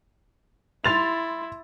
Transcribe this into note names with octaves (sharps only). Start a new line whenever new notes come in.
E4 C6 A6 F7